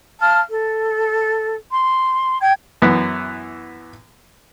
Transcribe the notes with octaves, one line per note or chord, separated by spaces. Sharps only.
F5 A5 F6
A4
C6
G5 G#6
F#2 E3 B3 B4